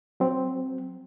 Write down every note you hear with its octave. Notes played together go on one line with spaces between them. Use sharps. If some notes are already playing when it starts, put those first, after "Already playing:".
F#3 C4